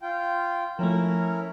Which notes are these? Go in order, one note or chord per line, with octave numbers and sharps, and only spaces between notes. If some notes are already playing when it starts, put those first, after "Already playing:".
F4 G5
F3 A3 C#4 E4 A#4